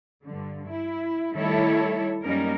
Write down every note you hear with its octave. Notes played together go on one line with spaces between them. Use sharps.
G2 D3
E4
D#3 G3 A3 E4 A4 C#5
F#2 G3 A#3 C#4 D#4 A#4